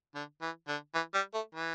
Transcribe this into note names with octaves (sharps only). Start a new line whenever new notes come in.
D3
E3
D3
E3
G3
A3
E3